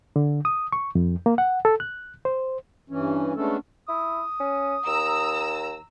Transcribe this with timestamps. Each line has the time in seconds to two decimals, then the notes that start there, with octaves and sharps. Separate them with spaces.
0.16 D3
0.45 D#6
0.72 C#6
0.95 F2
1.26 A#3
1.38 F#5
1.65 A4
1.80 F#6
2.25 C5
2.90 G2 E3 C#4
3.36 G#3 A3 B3 C#4 D4 A4
3.88 E4 D#6
4.40 C#4
4.87 D#2 A#5 E6